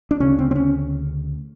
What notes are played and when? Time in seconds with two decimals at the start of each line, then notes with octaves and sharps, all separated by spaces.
0.11 D4
0.20 D2 C#3 C#4
0.39 C4
0.51 C4
0.55 C#4